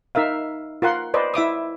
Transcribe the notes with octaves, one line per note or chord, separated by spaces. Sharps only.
D#4 A#4 E5 F5
F4 A#4 F#5 C6
B4 C5 D5 D#5
E4 E5 D6 D#6